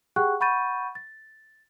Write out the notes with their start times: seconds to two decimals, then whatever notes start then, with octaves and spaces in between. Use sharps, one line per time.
0.16 G4 G#4 F#5 G5 C#6 F#6
0.40 F#5 B5 C#6 G6 A6 D#7
0.95 A6